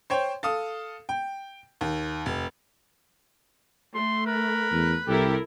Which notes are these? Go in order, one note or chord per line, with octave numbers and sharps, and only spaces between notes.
C5 C#5 G5
A4 F5 D#6
G5
D#2
F1
A3 C6
A#4 B4
E2
C2 E4 G4 A4 A#4